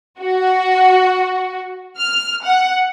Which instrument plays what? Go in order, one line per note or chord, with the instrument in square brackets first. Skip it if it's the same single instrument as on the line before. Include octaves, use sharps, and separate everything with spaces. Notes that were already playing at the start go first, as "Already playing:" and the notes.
[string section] F#4
F6
F#5